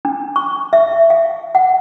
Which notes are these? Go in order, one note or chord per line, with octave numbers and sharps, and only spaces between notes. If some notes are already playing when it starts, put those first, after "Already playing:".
D4
C#6
E5
F5
F#5